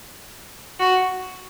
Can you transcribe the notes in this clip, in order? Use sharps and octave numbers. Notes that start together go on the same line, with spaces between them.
F#4